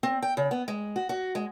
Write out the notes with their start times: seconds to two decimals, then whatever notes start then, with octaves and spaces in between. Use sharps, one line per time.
0.03 C4
0.22 G5
0.37 C#3
0.51 B3
0.68 G#3
0.96 F#4
1.09 F#4
1.35 G#3